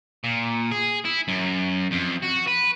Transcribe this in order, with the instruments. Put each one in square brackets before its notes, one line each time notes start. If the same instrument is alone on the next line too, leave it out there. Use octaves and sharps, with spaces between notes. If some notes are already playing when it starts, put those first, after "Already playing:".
[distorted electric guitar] A#2
G#4
E4
F#2
F2
F#4
B4